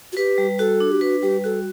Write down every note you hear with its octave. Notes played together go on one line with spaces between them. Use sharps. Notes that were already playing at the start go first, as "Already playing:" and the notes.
F#4
G4 B4
G3
F#4 A4
D4
G4
F#4 B4
G3 G4
F#4 A4